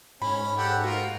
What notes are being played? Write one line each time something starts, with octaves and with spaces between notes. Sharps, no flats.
G#2 C#4 B5
G4 A4 F#5
A#3 F4 F#4 A#4